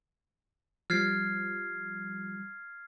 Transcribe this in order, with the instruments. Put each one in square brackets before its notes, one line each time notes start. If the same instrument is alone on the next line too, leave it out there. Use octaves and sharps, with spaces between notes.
[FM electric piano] F3 G3 [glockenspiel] F6 G#6 C7